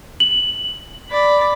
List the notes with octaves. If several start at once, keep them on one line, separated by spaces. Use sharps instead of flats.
F#7
D5 B5